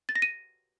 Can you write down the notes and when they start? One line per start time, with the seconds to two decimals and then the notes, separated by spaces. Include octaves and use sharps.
0.09 A6
0.15 A#6
0.22 D#7